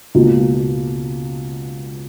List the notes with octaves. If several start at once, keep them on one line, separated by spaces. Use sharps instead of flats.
C#2 B2 A#3